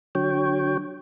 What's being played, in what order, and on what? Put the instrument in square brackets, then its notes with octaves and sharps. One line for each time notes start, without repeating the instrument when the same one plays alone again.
[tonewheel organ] D3 F#3 C#5 G5